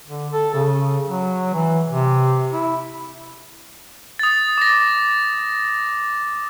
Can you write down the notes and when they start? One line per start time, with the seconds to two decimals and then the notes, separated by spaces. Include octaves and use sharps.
0.08 D3
0.32 A4
0.55 C#3
1.06 F#3
1.54 E3
1.87 C3
2.52 E4
4.19 D#6 A6
4.58 D6 A#6